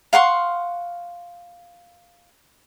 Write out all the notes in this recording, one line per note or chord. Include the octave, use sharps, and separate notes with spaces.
F5 F#5 C6 C#6